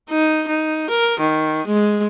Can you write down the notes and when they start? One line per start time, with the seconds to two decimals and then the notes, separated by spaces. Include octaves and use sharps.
0.11 D#4
0.48 D#4
0.90 A#4
1.20 D#3
1.67 G#3